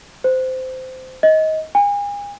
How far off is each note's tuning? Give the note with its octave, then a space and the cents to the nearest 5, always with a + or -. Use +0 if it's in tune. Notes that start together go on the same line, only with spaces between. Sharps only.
C5 -15
D#5 +20
G#5 -40